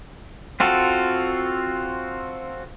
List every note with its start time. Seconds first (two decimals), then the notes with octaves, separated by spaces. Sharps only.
0.60 C4 F4 F#4 A4